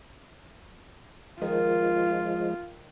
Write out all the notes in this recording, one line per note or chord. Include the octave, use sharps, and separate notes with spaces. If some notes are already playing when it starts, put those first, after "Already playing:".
D#3 F3 G#3 F4